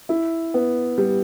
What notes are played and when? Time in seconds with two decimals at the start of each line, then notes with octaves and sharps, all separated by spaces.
0.09 E4
0.54 B3
0.98 G3